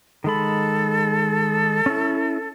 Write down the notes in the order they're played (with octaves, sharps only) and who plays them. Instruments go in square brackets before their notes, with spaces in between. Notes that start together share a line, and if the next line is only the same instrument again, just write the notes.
[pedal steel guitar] D#3 G#3 B5 [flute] A4
[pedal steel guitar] C#4 E4